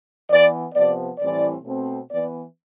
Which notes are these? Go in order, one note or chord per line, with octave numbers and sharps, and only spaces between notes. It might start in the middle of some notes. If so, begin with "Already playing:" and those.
E3 B3 D5
C3 F3 B3 D5
A2 E3 G3 C4 D5
B2 A3 C4
E3 B3 D5